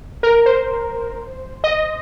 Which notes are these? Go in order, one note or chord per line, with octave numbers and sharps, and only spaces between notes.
A#4
C5
D#5